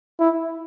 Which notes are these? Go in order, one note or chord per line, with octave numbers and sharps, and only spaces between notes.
E4